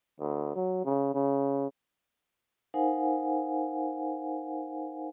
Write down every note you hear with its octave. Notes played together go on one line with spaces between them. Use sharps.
D2
F#3
C#3
C#3
D#4 A#4 C5 F5 F#5 G#5